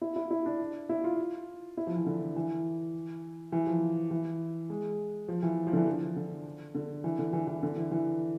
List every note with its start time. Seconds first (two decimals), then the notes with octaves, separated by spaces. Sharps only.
0.02 E4
0.16 E4
0.31 E4
0.46 D4
0.89 E4
1.04 F4
1.77 E4
1.87 F3
1.96 E3
2.06 D3
2.36 E3
3.52 E3
3.67 F3
4.11 E3
4.70 G#3
5.28 F3
5.43 E3
5.67 F3
5.73 D3
5.77 E3
5.87 F3
6.16 D3
6.75 D3
7.04 E3
7.19 D3
7.33 E3
7.47 E3
7.63 D3
7.77 E3
7.92 E3